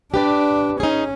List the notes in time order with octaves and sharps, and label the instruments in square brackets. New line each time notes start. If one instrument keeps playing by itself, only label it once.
[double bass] D4 [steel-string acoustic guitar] G4 B4 D5
[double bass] C#4 [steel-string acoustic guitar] D#4 G#4